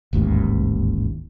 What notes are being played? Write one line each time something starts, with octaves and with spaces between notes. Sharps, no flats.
D1 A1 D#2 G#2